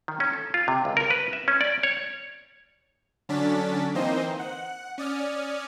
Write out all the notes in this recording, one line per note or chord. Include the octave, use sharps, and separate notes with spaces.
D#3
C#4
A4
F4
C3
C#2
A#4
B4
E5
C#4
D5
C#5
D3 F#3 C#4 D4 A6 B6
E3 A#3 C4 D#4 C5 D#5
F#5
C#4 D5 D#6 F6